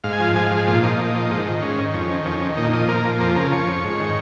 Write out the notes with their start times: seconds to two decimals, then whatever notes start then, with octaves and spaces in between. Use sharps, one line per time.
0.04 G#2 F5
0.13 G#5
0.20 F3 F5
0.35 G#2 G#5
0.46 F5
0.51 F3
0.57 G#4
0.67 A#2 F4
0.83 F3 D#4
0.99 A#2
1.15 F3
1.31 G#2
1.47 D#3
1.62 G#2 C#4
1.78 D#3
1.94 F2 C#4
2.09 D#3
2.25 F2 C#4
2.42 D#3
2.57 A#2 D#4
2.73 F3 D#5
2.89 A#2 A#4
3.05 F3
3.20 F2 A#4
3.36 C#3 A#4
3.52 F3 C#5
3.67 F2
3.84 G#2
4.00 D#3